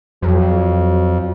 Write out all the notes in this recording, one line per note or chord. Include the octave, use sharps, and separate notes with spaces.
F2 F#3